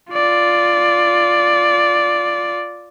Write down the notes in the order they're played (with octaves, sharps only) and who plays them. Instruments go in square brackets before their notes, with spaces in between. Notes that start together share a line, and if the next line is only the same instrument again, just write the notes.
[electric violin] F4 D5